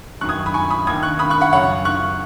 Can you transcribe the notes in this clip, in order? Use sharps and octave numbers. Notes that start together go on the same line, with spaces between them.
F#2 D#3 C#6 F#6
D#6 G#6
B5 D#6
G#5 C#6
B5 D#6
D#2 D#3 D#6 G#6
C#6 F#6
B5 D#6
C#6 F#6
F#5 B5
F#2 C#3 C#5 F#5
C#6 F#6